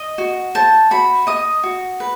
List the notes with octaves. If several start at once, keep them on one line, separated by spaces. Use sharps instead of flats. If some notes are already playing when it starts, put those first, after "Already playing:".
Already playing: D#5
F#4
C5 A5
F#4 B5
D#5 D#6
F#4
B4